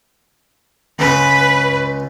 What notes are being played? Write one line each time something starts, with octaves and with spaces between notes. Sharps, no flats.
C#2 C#3 C#4 B4